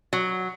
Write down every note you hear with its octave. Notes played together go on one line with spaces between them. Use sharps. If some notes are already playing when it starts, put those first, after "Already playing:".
F#3